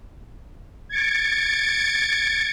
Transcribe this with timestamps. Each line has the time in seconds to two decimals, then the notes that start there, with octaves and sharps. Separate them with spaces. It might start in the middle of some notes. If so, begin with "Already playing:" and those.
0.89 G#6 A6 C#7 D7